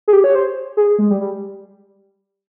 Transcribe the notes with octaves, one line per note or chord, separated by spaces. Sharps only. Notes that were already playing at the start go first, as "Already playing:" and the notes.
G#4
G4
C#5
C5
G#4
G#3
G3
G3